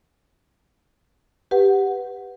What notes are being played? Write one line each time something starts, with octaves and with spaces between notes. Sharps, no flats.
G4 B4 F#5